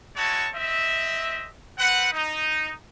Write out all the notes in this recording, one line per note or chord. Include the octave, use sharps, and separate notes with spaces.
G#3 E4 F#4 C#5 A5
C4 D#5 E5
C4 B4 F#5
D#4